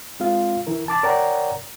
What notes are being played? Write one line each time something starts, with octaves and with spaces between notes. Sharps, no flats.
G#3 C4 F4 F5
E3 E4 A#4
A5 D6 A6
A#4 C#5 D5 F#5 G5 A#5